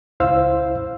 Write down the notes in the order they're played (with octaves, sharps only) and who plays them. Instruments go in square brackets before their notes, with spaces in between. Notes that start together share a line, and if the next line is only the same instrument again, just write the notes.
[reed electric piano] C#2 E4 C5 F5 E6